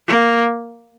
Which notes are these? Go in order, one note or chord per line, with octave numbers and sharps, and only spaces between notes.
A#3